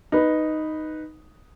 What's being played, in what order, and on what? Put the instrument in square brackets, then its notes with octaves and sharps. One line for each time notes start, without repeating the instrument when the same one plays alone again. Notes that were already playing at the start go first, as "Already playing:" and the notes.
[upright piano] D#4 B4